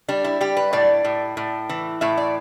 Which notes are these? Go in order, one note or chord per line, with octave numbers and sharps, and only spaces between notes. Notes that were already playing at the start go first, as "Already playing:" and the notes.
G3 D4
E4
G3 G4
B4
A2 D5
A2
A2
E3
A2 E5
D5